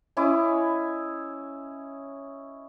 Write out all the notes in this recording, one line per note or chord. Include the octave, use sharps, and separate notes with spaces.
C#4 E4 D#5 D6